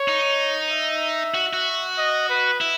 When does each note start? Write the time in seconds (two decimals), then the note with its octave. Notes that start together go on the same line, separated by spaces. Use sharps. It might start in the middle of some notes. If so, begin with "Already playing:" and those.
Already playing: C#5
0.08 D#4
0.71 E5
1.34 F#4
1.53 F#4
1.97 D#5
2.29 B4
2.61 E4